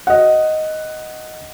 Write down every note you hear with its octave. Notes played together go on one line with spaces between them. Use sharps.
D#5 F#5